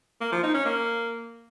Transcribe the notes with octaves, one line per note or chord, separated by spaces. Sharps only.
A#3
F3
D#4
C#4
A#3